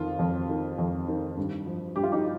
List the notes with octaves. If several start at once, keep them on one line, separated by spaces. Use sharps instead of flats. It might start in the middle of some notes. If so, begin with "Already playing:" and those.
Already playing: F2 D#3 F4
F2
D#3
F2
D#3
G2
F3
G2 G4
F4
D#4 G4